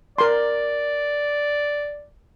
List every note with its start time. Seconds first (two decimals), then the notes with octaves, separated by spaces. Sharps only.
0.18 A#4 D5 C6